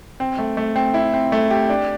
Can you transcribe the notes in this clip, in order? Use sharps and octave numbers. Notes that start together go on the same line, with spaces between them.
C4
A3
A3
C4
E4
C4
A3
G4
D4